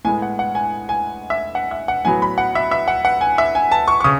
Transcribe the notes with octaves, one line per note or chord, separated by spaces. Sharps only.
A2 G#3 B3 G#5
F#5
F#5
G#5
G#5
E5
F#5
E5
F#5
A2 F#3 B3 G#5
B5
F#5
E5
E5
F#5
F#5
G#5
E5
G#5
A5
C#6
C#6
C#3 D#6